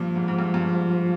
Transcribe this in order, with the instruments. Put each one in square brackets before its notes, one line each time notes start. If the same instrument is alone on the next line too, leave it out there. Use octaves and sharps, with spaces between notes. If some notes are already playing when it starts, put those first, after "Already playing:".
Already playing: [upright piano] G2 A#2 [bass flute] F3
[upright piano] G#2
G#2
G2
G2
G#2